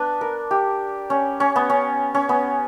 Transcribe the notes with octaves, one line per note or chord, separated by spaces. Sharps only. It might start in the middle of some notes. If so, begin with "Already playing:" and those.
Already playing: B3 D4 B4
A#4
G4
C#4
C#4
B3
C#4
C#4
B3